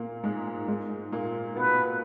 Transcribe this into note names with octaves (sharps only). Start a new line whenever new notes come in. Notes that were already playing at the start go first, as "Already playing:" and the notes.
Already playing: A#2 A#3
G#2 G#3
G#2 G#3
A#2 A#3
B2 B3 B4